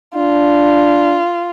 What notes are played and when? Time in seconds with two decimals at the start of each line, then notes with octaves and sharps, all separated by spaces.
0.15 D4 F4